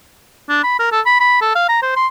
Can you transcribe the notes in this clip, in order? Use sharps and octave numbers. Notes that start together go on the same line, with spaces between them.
D4
B5
A#4
A4
B5
B5
A4
F5
A#5
C5
C6